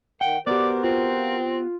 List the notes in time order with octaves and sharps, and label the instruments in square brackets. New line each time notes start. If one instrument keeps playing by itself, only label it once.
[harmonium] D#3 [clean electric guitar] F#5 [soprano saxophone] G5
[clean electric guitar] B3 G4 [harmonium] F#4 A#4 C5 [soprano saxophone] D5 [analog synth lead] D6
[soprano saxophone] C4 [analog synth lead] F4